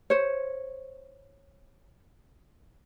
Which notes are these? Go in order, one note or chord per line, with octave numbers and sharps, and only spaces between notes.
C5 C#5